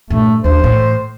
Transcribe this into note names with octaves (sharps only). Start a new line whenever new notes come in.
G2 A#2 A3
D#2 D4 C5
A2 E3